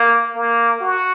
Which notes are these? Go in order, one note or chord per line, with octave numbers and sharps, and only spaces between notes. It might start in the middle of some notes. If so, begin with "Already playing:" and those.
Already playing: A#3
A#3
F#4